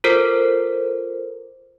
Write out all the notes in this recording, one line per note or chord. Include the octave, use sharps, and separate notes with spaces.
F4 A4 A#4 C5